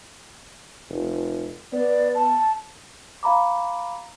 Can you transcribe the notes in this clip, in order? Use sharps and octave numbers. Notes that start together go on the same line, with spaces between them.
F1
B3 D5
A5
F5 A#5 B5 D6